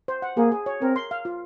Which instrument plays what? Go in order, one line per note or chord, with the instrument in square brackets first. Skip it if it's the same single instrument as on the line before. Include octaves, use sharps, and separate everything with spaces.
[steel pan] C5
F#5
[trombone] A#3 [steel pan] G#4
[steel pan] G#4
C#5
[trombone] C4 [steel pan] A#4
[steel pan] C6
F5
F4